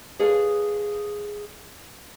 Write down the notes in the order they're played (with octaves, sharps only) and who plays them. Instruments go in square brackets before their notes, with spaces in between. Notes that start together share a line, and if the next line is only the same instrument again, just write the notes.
[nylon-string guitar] G#4 A4 B4 C#5 F5